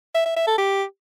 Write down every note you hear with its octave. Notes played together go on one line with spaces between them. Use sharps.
E5
E5
E5
A4
G4